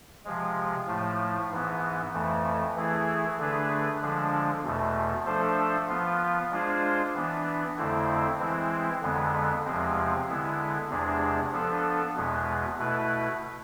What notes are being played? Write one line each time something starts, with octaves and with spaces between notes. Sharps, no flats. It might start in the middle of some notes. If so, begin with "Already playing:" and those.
C3 F3 G#3
A2 F3 A3
G#2 E3 B3
F2 E3 A3
E3 A3 E4 G#4
D3 A3 D4 G#4 B4
D3 F3 G#3 D4
E2 B2 A3
F3 A3 D4 A4 C5
F3 B3 F4
G#3 D4 F4 G#4 C5
E3 B3 D4
F2 D3 A3 C4 E4
E3 G#3 C4 E4
F2 D3 G#3 B3
E2 C3 F3 G#3 C4
D3 G#3 B3 E4
E2 C3 G#3 D4 G#4
F3 B3 D4 A4
E2 B2 G#3 B3
B2 A3 E4 B4